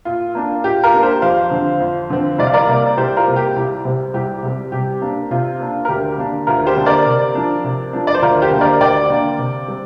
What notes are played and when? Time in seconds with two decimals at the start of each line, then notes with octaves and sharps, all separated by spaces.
0.05 A#2 F4
0.35 A#3 D4
0.64 A#2 G4
0.84 F4 A#4
0.94 A#3 D4
1.03 G4 C5
1.22 F2 C5 F5
1.51 D3 F3 C4
1.80 F2
2.10 D3 F3 C4
2.39 C2 D5
2.47 F5
2.54 A#4 D5
2.68 C3 A#3
2.97 C2 G4 C5
3.17 F4 A#4
3.26 C3 A#3
3.36 G4
3.56 C2
3.85 C3 G3 C4
4.14 C2 G4
4.43 C3 G3 C4
4.72 C3 G4
5.02 A#3 D4
5.31 C3 F4
5.60 A#3 D4
5.85 A#4
5.89 D2 G4
6.18 D3 A#3 D4
6.47 D2 F4 A#4
6.66 G4 C5
6.77 D3 A#3 D4
6.86 A#4 D5
7.06 C3
7.35 F3 D4
7.64 C3
7.93 F3 D4
8.07 D5
8.14 C5
8.22 D2 F4 A#4
8.42 G4 C5
8.51 D3 A#3
8.61 A#4 D5
8.80 D2 D5 G5
9.10 D3 A#3
9.39 C3
9.68 G3 C4